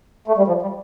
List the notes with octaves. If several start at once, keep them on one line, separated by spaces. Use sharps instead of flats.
A3
G3
F3
G3